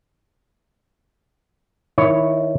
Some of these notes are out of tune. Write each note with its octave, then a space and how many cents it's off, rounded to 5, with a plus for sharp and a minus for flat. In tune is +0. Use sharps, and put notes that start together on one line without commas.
D#3 +20 E4 +0 C#5 +0